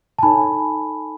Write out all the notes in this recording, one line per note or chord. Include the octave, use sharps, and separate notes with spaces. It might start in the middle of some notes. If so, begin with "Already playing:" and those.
A5
D#4 A4 C#5 G#5 B5